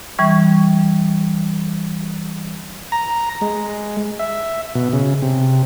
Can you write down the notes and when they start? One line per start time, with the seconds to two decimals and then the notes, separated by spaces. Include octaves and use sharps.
0.19 E3 G3 C#6
2.92 A#5
3.41 G#3
4.19 E5
4.75 B2
4.93 C#3
5.22 C3